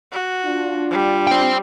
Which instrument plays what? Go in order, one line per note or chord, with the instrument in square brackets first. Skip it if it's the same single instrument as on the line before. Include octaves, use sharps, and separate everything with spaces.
[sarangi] F#4
[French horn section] D4 F4
[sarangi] G3
[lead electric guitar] C5 G5